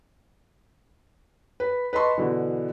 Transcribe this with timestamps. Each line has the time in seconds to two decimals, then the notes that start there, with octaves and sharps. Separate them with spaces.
1.60 B4
1.93 B4 D#5 A5 C6 C#6
2.18 B2 D3 E3